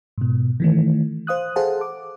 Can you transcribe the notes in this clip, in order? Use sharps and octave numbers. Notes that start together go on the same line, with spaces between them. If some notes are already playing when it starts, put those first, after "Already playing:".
G#2 B2
D#3 E3 A3
C5 F5 D#6 F#6
G#4 A4 C5 F5 F#5 A5
D6